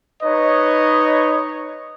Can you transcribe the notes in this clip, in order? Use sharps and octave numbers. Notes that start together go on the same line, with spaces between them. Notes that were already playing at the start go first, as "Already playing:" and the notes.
D#4 B4 C#5 D#5